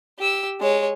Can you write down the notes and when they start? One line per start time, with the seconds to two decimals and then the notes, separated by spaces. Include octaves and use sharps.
0.19 G4 E6
0.61 G#3 C#5